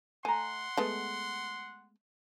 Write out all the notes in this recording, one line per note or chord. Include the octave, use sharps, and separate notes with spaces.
A3 F#5 G#5 A#5 C6
G#3 A3 B3